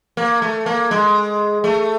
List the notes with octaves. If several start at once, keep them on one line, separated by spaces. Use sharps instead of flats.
A#3
A3
A#3
G#3
A3